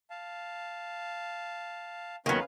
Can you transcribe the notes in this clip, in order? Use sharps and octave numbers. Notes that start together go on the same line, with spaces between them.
F5 A5
D#2 D#3 F#3 B3 C#4 B4 F5